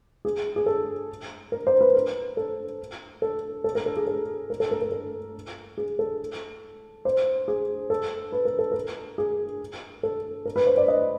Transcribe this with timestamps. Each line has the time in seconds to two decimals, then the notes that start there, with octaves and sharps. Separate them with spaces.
0.25 G#4
0.56 G#4
0.66 A4
1.52 A#4
1.67 C5
1.81 B4
1.95 A#4
2.37 A4
3.22 A4
3.64 A4
3.75 A#4
3.86 A4
3.97 G#4
4.07 A4
4.50 A#4
4.60 A4
4.71 A#4
4.82 A#4
4.92 A4
5.78 G#4
5.99 A4
7.05 C5
7.48 G#4
7.90 A4
8.32 B4
8.45 A#4
8.59 A4
8.72 A#4
9.18 G#4
10.03 A4
10.45 A#4
10.56 B4
10.67 C5
10.77 D5
10.88 D#5